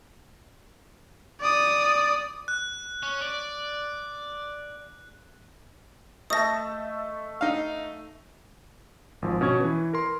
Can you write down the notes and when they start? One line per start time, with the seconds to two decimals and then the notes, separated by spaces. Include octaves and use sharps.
1.41 D5 D#6
2.48 F#6
3.03 C#4
3.22 D5
6.30 A3 D#5 E5 A5 D#6 A#6
7.41 D#4 F5
9.22 G#1 F3
9.41 B2 C#4 C#6 G#6
9.60 E3 B4
9.93 A#4 C6